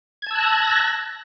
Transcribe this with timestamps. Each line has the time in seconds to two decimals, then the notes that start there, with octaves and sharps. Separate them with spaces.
0.22 G#6
0.26 A5
0.31 E6
0.35 F#6
0.39 A#6